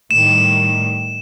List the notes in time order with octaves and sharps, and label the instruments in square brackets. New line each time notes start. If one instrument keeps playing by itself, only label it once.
[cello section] A2 D#3 G3 [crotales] E7